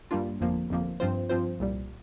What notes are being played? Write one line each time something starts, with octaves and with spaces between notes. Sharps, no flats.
G2 G3 A#3 D4 F4
G1 F2 F3 A#3
G1 F2 F3 A#3
G2 F3 C4 F4 C5
G2 F3 C4 F4 C5
C2 A#2 G3